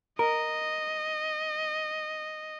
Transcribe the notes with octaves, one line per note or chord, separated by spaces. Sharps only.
A#4 D#5